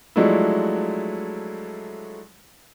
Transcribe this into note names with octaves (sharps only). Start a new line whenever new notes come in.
F3 F#3 G#3 A3 D4 E4